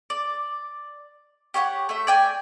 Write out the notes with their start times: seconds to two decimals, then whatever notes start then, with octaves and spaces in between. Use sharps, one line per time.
0.10 D5
1.54 G4 C#5 E5 F#5
1.89 A3 E5
2.07 D5 G5 G#5